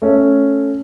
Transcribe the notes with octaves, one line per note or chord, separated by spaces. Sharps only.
A3 C#4